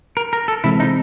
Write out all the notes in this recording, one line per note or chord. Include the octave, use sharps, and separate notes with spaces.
A#4
A#4
A4
C3 E3 G#3 C4 E4
D#4